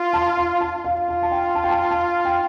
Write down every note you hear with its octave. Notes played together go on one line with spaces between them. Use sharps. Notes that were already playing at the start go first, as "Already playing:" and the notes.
Already playing: F4
A5
F5
A5
F4 F5
F5
A5
G5
A5
G5
A5
A5
G5